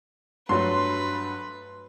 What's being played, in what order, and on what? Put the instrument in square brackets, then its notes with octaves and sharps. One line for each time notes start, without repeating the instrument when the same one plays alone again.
[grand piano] G2 F#3 A3 [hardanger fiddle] B4 [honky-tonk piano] C6